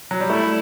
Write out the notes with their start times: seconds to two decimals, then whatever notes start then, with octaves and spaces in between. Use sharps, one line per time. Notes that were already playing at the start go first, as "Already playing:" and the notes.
0.11 F#3
0.21 G3
0.29 A3 E4